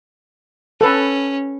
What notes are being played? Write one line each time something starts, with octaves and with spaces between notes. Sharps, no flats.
C#4 A4 B4